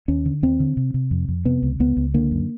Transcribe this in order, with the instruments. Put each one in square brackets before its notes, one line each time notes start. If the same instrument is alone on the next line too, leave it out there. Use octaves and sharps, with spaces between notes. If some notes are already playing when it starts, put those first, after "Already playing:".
[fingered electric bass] D#2 C#4
D3
D#2 C4
D3
C3
C3
F2
F2
C3 B3
C#2
C#2 B3
C#2
D3 A#3
F#2